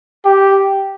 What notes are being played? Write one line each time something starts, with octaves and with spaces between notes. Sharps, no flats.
G4